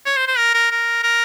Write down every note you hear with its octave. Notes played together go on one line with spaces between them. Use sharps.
C#5
C5
C5
A#4
A#4
A#4
A#4